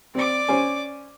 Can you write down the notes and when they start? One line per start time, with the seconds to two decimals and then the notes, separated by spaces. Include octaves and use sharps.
0.15 C4 D5 D6
0.48 C#4 C5 G#5